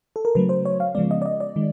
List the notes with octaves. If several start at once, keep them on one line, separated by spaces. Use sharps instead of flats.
A4
A#4
C#3 F#3 A3 B4
C5
C#5
F5
C#3 F3 G#3 B3 D5
D#5
D5
D#5
D5
D#3 G#3